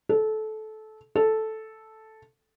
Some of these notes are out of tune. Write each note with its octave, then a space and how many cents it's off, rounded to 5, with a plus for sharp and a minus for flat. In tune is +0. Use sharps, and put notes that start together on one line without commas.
A4 -20
A4 -5